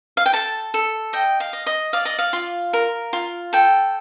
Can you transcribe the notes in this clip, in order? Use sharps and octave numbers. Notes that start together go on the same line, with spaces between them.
F5
G5
A4 A5
A4
D#5 G5
F5
D#5
D#5
D5 F5
D#5
F5
F4
A#4
F4
A4 G5